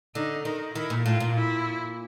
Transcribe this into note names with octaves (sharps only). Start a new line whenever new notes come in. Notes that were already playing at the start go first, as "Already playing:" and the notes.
D3 D#4
D#3 D#4
D#3 E4
A#2
A2 F4
A#2
E4